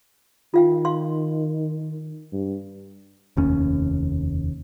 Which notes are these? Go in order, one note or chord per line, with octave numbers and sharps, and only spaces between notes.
D#3 F4 F5 G5
F5 C6
G2
F1 D#2 C#4